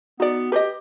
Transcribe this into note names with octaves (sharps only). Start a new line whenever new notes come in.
B3 D#4 F#4 D5
G4 B4 C5 D#5